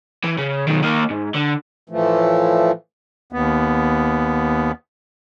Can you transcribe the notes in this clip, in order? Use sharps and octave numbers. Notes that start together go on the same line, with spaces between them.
E3
C#3
B1 D#3
D#3 A#3
G#2
D3
A2 E3 F3 A3
D#2 B3